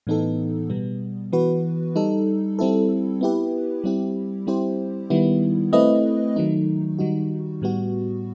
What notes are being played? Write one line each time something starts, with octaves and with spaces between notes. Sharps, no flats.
A2 E3 B3 D#4 A4
B2 G3 B3
E3 B3 F#4 B4
G3 D#4 A4
G3 C4 E4 A4
B3 E4 G4 B4
G3 C4 E4 G4
G3 C4 E4 G4 C5
D#3 G3 B3 E4
A3 C4 E4 B4 D#5
D#3 F#3 A3 D#4
D#3 G3 D#4 F#4
A2 G3 B3 F#4